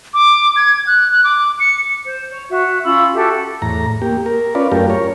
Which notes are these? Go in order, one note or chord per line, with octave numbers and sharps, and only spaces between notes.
D6
G#6
F#6
F#6
D6
C#7
C5
C#5
F#4 E5
C#4 F4 B5 E6
F#4 G4 A4 E5
E2 A2 A#5
A#3 G4
A#4
C#4 F4 B4 D5
F#2 A3 F4 G4 A#4
A#4 C#5